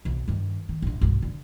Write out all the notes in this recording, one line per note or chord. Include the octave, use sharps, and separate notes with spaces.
B1 F2
G2 D#3
D#3
A#1 D4
B1 G2
D3